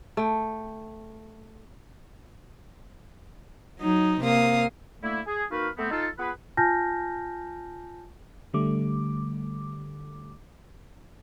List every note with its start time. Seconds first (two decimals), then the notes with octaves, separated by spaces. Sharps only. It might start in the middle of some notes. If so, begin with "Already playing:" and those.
0.17 A3 G5
3.79 F#3 D#4
4.22 C3 A#3 F5 D#6
5.03 D3 A3 A#3 E4
5.26 G#4
5.50 A#3 D#4 F#4 B4 F5
5.78 A3 B3 C4
5.90 D#4 F4 A4
6.18 B3 F4 G#4 B4
6.57 F4 G#5 A5 F6 G6 A#6
8.53 D3 G3 A3 D6